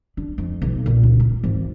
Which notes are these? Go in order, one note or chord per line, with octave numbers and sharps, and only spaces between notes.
D4
F2
B1
A#2
C#2
F4
G#1